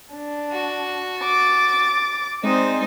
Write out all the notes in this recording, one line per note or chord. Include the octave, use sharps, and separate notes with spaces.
D4
F#4
D6 A6
G#3 C4 D#4 C5 D5